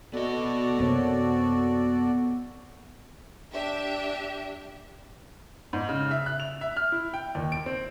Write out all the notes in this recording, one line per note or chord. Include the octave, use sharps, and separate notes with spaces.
B3 F#4 A4 D5 D#5
F#2 C3 A#3 C4 C#5
D4 G4 E5
G#2
C#3
E5
F#6
F7
E5
F6
E4
G5
D#2
D7
C4